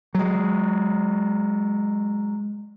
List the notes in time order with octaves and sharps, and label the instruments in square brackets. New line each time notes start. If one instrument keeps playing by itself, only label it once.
[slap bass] F#3 G#3